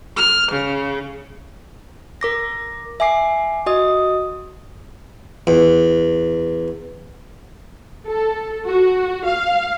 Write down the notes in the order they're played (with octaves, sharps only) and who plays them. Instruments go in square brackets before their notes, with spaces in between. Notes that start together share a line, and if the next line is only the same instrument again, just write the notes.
[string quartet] F6
C#3
[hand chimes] A#4 D6 A#6
E5 G#5 D6 C7
F#4 D#5 D#6
[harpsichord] E2
[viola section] A4
F#4
F5